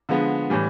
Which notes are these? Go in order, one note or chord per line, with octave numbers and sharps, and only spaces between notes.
D3 F3 G#3 B3
A2 E3 G3